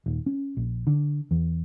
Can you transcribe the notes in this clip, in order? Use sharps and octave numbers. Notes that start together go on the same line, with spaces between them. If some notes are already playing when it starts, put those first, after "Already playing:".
D#1
C#4
A#1
D3
E2